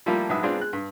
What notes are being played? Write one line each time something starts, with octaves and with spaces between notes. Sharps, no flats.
F3 G3 A3 A#3 E4 F4
A#1 G#2 F#3 B4 E5 D#6
G#3 B3 C4 D4 F4
G#3 F#6
G2